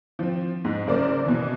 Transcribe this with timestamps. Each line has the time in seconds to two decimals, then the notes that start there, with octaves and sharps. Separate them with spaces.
0.19 F3 C4
0.65 G#2
0.87 F#1 C#3 A#4 C5 D5
1.25 B2 E3